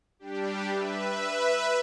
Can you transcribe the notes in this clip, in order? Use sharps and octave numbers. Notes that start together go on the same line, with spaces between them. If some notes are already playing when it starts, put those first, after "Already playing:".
G3 D4 G4
B4 E5